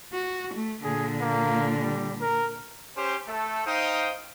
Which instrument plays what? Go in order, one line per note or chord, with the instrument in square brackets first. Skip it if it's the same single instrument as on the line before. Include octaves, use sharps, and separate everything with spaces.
[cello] F#4
A3
[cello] A#2 D3 [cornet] G#4
[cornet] A#3
G3
A#4
[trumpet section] C#4 G4 C5
A3 A4
D#4 C5 F5 G5 D#6